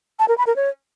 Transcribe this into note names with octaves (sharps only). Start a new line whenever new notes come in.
A5
A#4
B5
A#4
C#5